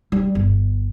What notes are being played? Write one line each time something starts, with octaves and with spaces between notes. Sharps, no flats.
G3
G1